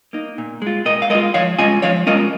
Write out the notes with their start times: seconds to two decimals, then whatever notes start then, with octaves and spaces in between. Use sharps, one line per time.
0.13 A#3 D#4
0.38 A#2
0.62 G#3 F4
0.85 A#2 A#4 D#5
1.02 F5
1.10 G#3 A#4 D#5
1.14 F4
1.34 F3 C#5 F5
1.59 G#3 C#4 F4 D#5 G#5
1.82 F3 C#5 F5
2.07 G#3 C#4 F4 A#4 D#5